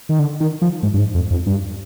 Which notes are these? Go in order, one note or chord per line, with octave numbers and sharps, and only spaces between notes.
D#3
D3
D#3
F3
G#2
G2
G#2
F2
F2
G2